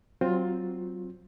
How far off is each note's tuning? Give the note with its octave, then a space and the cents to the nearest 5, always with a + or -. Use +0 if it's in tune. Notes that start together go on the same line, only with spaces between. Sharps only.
F#3 +20 C4 +0 F4 +15